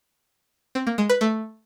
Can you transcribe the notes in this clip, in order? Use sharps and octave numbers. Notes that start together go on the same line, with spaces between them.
C4
A#3
G#3
B4
A3